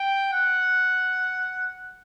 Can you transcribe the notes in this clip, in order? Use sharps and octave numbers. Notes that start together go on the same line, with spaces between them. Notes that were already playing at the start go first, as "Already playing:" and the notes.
Already playing: G5
F#5